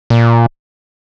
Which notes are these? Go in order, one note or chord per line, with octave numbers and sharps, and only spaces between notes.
A#2